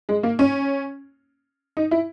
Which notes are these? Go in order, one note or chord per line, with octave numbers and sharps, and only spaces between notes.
G#3
A#3
C#4
D#4
E4